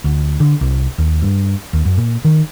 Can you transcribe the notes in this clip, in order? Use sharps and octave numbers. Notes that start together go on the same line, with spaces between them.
D2
D3
C2
D#2
G2
D#2
F#2
A#2
D#3